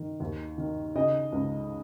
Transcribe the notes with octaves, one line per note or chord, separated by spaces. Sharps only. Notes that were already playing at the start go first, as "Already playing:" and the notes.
Already playing: D#3
D#2
D#3
C#3 D#5
C#2